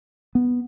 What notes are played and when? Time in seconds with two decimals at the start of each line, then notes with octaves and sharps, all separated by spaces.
0.35 B3